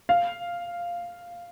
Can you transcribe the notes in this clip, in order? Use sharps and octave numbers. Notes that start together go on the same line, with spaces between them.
F5